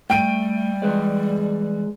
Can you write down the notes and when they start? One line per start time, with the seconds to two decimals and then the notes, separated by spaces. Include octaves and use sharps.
0.10 G3 A3 G5 D7 D#7
0.82 E3 G#3 B4 D5